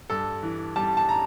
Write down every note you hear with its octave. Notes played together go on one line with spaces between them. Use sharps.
G2 A4
E3
G3 A5
A5
A#5